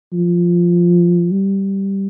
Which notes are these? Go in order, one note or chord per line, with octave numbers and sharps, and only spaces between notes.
F3
G3